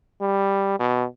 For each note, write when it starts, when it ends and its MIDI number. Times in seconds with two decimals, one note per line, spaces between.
0.21 0.75 55
0.80 1.05 47